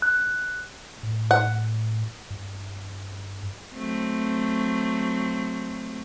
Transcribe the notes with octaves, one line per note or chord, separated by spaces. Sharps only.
F#6
A2
F#5
G2
F#3 A3 C4